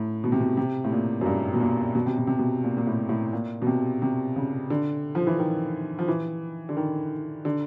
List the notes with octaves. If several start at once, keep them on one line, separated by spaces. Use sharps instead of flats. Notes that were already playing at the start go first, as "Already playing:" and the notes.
Already playing: A2
B2
C3
B2
C3
A2
A#2
F#2
G2
B2
A#2
B2
C3
B2
C3
B2
A#2
A#2
A2
A2
A#2
B2
C3
C3
C#3
D3
F3
E3
D#3
F3
E3
D3
D#3
D3